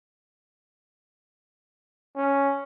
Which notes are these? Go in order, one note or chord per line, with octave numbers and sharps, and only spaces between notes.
C#4